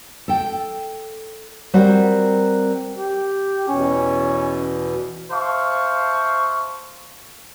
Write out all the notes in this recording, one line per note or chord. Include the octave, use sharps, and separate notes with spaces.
A4 G5
G3 C4 F#4 A#4 C5
G4
E2 B2 C#4
C5 E5 F5 A5 C#6